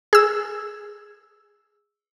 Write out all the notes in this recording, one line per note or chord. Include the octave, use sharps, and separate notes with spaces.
G#4 E6